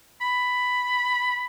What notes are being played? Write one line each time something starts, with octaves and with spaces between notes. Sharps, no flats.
B5